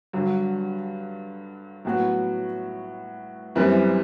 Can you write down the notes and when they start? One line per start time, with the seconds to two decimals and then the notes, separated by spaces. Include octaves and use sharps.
0.13 G2 D3 F#3
1.85 A2 F#3 B3 F#4
3.55 F#1 F#2 E3 G3 C4